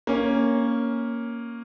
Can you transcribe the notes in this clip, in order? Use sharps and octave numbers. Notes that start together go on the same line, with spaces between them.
A#3 C#4